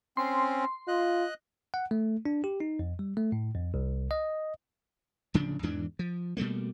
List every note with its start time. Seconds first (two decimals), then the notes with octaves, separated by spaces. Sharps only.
0.17 C4 C#4 C6
0.88 F4 D#5 F#6
1.74 F#5
1.91 A3
2.25 D4
2.44 G4
2.60 D#4
2.79 F2
2.99 G3
3.17 A3
3.32 A2
3.55 F2
3.74 C2
4.11 D#5
5.34 D1 C#3 F3 D4
5.63 E2 G#2 E3 D4
5.99 F3
6.37 B2 G3 A3 A#3